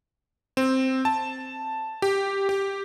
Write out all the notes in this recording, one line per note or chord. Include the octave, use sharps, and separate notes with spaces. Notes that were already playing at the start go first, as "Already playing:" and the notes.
C4
A5
G4
G4